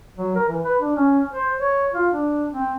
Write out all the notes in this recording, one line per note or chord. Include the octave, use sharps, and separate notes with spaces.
F#3
A#4
E3
B4
D4
C#4
C5
C#5
F4
D4
C4